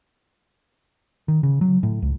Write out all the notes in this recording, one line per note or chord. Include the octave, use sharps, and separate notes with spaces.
D#3
C#3
F#3
A2
C#2